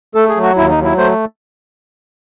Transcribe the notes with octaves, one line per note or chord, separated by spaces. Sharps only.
A3 A4
G#4
F#3
F#4
D#2 E4
D#4
F#3
E4
A3 C5